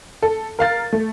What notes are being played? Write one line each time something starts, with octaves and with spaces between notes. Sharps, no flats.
A4
A#4 F5 A6
A3